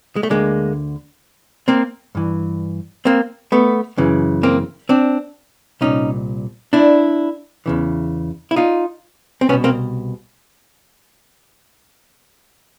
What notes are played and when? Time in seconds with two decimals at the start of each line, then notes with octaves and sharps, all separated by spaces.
0.16 G#3
0.23 A3
0.30 D2 D3 G#3 A#3
1.68 A#3 C4
2.15 G2 E3
3.05 A#3 C4
3.52 A3 B3
3.97 F#2 C#3 E3
4.43 A#3 C4
4.89 C4 D4
5.81 C2 A#2 C#4 D#4
6.73 D4 E4
7.66 E2 C#3 E3
8.51 E4
8.56 D#4 F4
9.41 C4
9.49 C2 B3 C#4
9.53 B2
9.64 A#3 C4